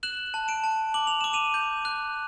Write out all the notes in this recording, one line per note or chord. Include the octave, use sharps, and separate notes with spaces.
F#6 E7 F#7
A5
D7 E7
A5
D6 F#7
F7
D6 E7
D#7 F7
G6
F#6